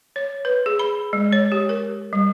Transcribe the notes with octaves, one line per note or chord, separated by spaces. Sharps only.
C#5
B4
G#4
B5
G#3
C#5
G4
A#4
G3